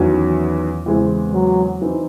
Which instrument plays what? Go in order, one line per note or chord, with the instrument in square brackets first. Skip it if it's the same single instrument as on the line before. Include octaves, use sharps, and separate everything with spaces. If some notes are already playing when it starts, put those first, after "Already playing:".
Already playing: [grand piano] E2 D#3 F#3 C#4 F#4
[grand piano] E2 C#3 G#3 C4 [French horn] E3
[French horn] F#3
[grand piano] E3 C4 D#4